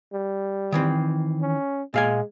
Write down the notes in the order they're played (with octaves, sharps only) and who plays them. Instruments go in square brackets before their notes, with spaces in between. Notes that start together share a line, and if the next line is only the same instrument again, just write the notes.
[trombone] G3
[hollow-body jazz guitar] D#3 E3 C4
[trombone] C#4
[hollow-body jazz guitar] A#2 F5 G#5 [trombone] G#3